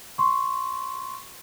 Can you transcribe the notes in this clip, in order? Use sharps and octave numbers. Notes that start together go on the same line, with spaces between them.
C6 C#6